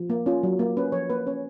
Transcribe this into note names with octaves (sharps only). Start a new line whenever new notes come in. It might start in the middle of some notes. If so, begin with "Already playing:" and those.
Already playing: F3
A#3
C#4 F4
F#3
A#3
C#4 B4
F3 C#5
A#3 B4
C#4 C#5